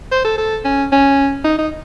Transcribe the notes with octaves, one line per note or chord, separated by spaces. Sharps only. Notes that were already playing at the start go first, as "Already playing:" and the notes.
C5
A4
A4
C#4
C#4
D#4
D#4